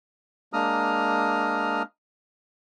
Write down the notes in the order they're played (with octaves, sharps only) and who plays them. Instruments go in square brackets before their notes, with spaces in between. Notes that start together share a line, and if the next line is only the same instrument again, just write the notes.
[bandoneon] G#3 A#3 D4 A#5 D#6 F6